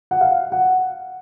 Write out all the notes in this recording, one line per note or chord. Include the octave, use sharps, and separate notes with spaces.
F#5
F5
F#5